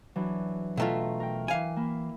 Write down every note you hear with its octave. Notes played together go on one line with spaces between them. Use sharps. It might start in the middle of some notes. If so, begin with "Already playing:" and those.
E3 F#3 D4
B2 A3 F4 E5 G5 A#5
A#4 G5
E3 F5 G#5
A#3 E4